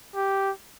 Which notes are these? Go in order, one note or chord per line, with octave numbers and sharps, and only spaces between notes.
G4